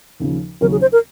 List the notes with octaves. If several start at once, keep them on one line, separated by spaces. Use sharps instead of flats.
D#2 C#3 F3
D#2 C#3 F#3 C#4 A#4
G#4
C5
A#4